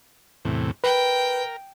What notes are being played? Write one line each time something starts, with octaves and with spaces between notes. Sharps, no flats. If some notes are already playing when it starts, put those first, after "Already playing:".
E2 A2 C3
A#4 B4 G5